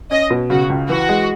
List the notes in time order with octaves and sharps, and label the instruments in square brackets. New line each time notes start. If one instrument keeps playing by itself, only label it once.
[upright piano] C#4 [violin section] D#5
[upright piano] B2
[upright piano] C#3 [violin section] F#4
[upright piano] C#2
[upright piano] E3 [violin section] F#4
[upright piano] G#3